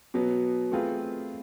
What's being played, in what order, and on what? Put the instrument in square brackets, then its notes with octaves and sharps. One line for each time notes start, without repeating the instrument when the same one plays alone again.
[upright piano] B2 F#3 B3
A3 C4 F4 G#4 B4